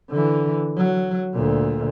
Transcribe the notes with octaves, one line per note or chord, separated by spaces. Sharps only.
D3 E3
F#3
D2 A#2